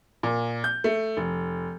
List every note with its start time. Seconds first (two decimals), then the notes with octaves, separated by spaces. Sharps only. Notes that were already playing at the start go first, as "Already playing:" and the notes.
0.23 A#2
0.64 G6
0.84 A3
1.17 F1